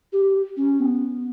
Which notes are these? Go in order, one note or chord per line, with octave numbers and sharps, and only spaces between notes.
G4
C#4
B3